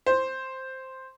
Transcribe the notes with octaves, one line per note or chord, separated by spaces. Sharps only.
C5